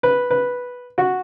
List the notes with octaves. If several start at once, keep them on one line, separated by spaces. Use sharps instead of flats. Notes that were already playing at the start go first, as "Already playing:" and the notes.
B4
B4
F#4